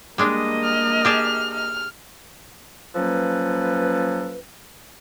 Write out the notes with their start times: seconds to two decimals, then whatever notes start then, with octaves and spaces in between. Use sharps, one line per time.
0.18 G3 G#3 A#3 D4 D#5
0.64 F6
1.05 G4 G#4 A5
1.55 F6
2.96 F3 F#3 A#3 C#4 A4 B4